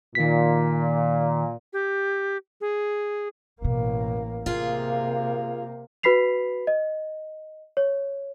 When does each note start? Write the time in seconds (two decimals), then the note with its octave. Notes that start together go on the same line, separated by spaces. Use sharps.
0.15 A#2 D#3 B6
1.73 G4
2.61 G#4
3.62 A1 E2 B2 A#3
4.46 C3 A#3 B3 F4 G#4
6.03 F#4 B4 B5 B6 C7 F7
6.67 D#5
7.77 C#5